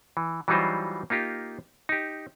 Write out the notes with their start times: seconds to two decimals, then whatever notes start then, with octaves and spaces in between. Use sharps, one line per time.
0.17 E3
0.48 E3 F#3 G3 D#4 F4 C5
1.10 A#3 D#4 F4 G4
1.89 D#4 G4